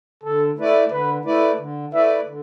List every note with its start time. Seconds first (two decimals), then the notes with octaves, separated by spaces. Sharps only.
0.24 D3 A4
0.58 A3 E4 B4 D5
0.91 D3 B4
1.25 A3 E4 B4 D5
1.59 D3
1.93 A3 E4 B4 D5 E5
2.26 D3